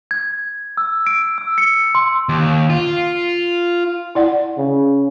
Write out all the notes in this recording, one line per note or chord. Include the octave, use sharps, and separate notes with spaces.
G#6
E6
D7
E6
C#7
C6
D#2
F4
E4 D5 F#5
C#3